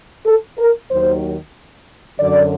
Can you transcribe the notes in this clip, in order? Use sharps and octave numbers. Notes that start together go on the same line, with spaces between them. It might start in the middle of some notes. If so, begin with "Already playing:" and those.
A4
A#4
D#2 D#3 F#3 C5
F#2 D3 F#3 D5